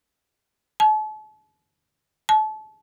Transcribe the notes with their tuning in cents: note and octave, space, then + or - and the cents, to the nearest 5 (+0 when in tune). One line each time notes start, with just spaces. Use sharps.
A5 -40
A5 -30